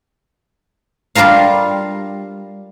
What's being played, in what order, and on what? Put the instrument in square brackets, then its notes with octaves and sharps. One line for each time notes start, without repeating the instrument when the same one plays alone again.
[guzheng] G3 D4 F4 A#4 F5